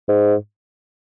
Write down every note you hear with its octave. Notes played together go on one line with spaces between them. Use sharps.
G#2